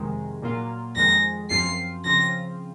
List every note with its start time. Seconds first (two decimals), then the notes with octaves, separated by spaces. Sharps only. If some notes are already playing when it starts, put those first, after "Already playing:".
Already playing: F2 C3 D#3 G#3
0.42 A#2 F#3 A#3 F4
0.96 F2 D#3 G#3 A#6
1.50 F#2 F3 C4 F4 C7
2.05 C#3 F3 C4 F4 A#6